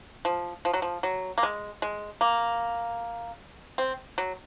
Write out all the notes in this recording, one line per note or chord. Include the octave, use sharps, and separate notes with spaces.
F3
F3
F#3
F3
F#3
A#3
G#3
G#3
A#3
C4
F#3